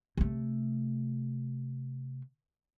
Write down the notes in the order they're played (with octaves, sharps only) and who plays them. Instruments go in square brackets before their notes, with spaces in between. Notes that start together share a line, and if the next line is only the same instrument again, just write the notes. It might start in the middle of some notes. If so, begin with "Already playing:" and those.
[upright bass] C3 A3